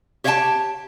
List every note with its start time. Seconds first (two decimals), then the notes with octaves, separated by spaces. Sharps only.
0.24 G4 C#5 E5 F#5 G5 A5